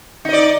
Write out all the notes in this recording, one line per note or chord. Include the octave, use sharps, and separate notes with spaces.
D#4 D5 D#5